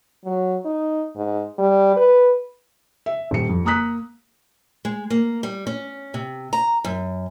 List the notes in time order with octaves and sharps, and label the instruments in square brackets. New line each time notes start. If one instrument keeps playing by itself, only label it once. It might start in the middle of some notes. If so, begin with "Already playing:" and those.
[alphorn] F#3
D#4
G#2
G3
B4
[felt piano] E5
D#1 C#7
F2
A#3 A#5 D#6 F#6 B6
[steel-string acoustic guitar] G#3
A#3
G3
C#4
C3
A#5
F#2